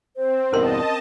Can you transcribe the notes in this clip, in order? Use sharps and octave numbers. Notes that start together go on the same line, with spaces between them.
C4 C5
E2 G2 B2 C#4 A#4 D#5 A5 C6